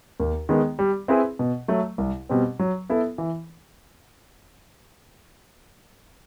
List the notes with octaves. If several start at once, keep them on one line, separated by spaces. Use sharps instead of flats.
D#2
D#3 G#3 B3
G3
C4 E4 G#4 B4
B2
F#3 A3
C2
B2 G3 C4
F#3
B3 E4 A4
E3